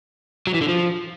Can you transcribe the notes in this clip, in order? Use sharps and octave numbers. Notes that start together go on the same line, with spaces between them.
F#3
E3
D3
F3